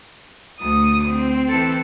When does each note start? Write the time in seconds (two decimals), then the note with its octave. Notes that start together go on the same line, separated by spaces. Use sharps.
0.61 D2 D#6
1.09 C4
1.49 E3 A4